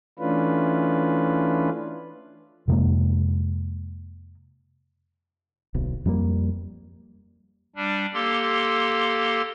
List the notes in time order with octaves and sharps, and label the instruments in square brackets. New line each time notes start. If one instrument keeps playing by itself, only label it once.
[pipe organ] E3 A3 C#4 D4 F4 B4
[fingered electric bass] F2 C3 G#3 A#3
D1 B1
F2 G3 G#3 A#3
[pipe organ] G3 D4
A#3 G4 A4 C6